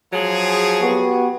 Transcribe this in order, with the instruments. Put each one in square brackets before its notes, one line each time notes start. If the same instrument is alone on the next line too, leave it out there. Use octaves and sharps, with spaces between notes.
[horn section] F3 F#3 G#4
[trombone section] B3 F#4 G4